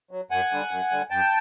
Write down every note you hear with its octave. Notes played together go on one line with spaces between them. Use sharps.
F#3
F#2 F#5 G#5
D3 G3
F#2
D3 G3
F#2 G5 A5